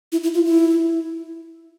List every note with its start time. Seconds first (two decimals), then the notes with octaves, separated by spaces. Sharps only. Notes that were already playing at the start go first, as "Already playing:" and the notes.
0.12 E4
0.23 E4
0.34 F4
0.45 E4